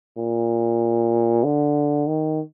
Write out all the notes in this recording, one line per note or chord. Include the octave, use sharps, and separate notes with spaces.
A#2
D3
D#3